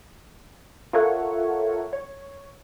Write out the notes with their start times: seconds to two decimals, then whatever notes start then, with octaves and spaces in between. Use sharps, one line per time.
0.93 F4 A4 A#4 C#5 E5 F#5
1.93 C#5